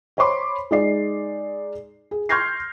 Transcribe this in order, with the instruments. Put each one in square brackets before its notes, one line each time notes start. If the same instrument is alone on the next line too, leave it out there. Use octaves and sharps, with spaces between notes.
[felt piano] C5 C#5 B5 C6 D6
G#3 D#4 D5 C7
G#4
C6 F6 G6 G#6 A#6 C7